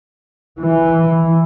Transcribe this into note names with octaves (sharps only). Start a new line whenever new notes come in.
E3